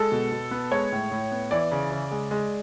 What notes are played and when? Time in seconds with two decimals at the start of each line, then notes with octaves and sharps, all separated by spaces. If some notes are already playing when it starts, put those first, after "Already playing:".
Already playing: G#3 A4
0.12 B2
0.32 B2
0.51 B3
0.71 G#3 C#5
0.92 A2
1.12 A2
1.32 B3
1.51 E3 D5
1.71 C#3
1.92 C#3
2.11 G#3
2.31 G#3